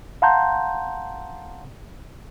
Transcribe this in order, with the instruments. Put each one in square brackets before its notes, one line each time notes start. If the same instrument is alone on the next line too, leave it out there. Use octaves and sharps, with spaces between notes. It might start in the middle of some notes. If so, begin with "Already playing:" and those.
[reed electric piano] F5 F#5 A5 A#5 C6 G6